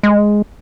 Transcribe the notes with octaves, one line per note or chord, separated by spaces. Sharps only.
G#3